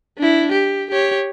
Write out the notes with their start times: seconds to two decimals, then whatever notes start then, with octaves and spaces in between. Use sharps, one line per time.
0.18 D4 E4
0.52 G4
0.91 G4 C#5